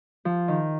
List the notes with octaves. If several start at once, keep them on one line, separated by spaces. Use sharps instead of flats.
F3
D#3